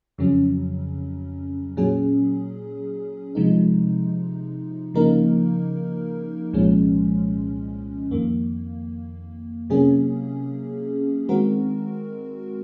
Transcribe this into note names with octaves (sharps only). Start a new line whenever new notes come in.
F2 C#3 F#3 C#4
A#2 F#3 C#4 G#4
C3 F3 G#3 D#4
C#3 F3 A#3 D#4 A#4
C2 A#2 F3 G#3 C#4
F2 D#3 A#3
C3 F#3 A#3 C#4 G#4
D#3 G#3 C4 F#4 A#4